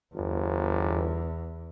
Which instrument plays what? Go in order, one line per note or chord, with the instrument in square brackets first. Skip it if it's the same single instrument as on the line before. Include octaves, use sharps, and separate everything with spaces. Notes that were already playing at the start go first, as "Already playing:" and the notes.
[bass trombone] G1 [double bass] E2